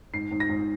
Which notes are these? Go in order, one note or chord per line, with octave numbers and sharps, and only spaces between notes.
G#2 C7
G#2
A#6
G#2